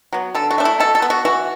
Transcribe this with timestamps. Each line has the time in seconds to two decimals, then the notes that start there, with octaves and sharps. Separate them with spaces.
0.13 F#3 B3
0.35 D3 A4
0.51 F#4
0.58 A3 D4
0.65 E4
0.80 B2 A4
0.95 A4
1.02 B3
1.10 F#4
1.25 E3 F#4